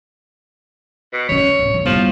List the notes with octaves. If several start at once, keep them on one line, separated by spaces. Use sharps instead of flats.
B2
D#3 C#4 C#5
D1
F2
G1 F3 E4